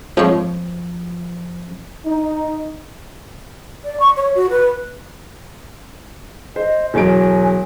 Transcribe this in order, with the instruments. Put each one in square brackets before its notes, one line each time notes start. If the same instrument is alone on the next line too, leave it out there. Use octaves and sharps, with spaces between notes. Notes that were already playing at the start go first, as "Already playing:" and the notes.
[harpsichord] F2 G#2 C#5 [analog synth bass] F3
[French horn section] D#4
[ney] D5
C#6
C#5
F#4
B4
[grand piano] C5 [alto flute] D#5
[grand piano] E1 F#3 D7 [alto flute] G#5